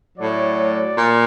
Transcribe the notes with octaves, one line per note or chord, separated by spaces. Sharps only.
A2 F#3 D5
A#2